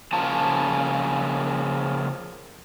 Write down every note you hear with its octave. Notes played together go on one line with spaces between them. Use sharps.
C#3 F3 A#3 F4 A5